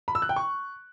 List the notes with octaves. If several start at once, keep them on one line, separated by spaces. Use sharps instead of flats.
B5
E6
F#6
G5
C#6